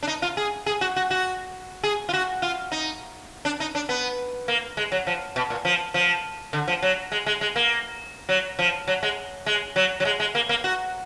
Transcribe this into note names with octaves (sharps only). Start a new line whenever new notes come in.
D4
D#4
F4
G#4
G#4
F#4
F#4
F#4
G#4
F4
F#4
F4
D#4
D4
D#4
D4
B3
A#3
G#3
F#3
F3
B2
A#2
F3
F3
D3
F3
F#3
G#3
G#3
G#3
A#3
F#3
F3
F#3
G#3
G#3
F#3
F#3
G#3
G#3
A#3
A#3
F#4